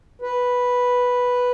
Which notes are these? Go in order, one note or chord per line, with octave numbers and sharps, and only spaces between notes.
B4